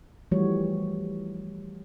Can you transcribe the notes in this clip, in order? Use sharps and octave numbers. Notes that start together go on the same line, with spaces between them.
E3 F3 G3 A3 F#4 C#5